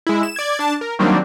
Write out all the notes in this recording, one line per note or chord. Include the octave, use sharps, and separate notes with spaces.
G#3 E4
E7
D5 G#6
D4 A5
A#4
D#3 F#3 G3 A#3 C4 D4